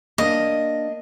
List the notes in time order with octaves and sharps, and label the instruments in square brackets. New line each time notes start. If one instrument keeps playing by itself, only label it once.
[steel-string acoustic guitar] A#3 D4 [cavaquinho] D#5